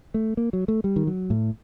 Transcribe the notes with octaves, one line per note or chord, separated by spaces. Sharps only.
A3
A#3
F#3
A3
G3
D#3
F#3
A2